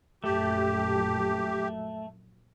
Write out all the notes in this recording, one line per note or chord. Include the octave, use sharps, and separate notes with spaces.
A#1 F#2 A#2 A3 G4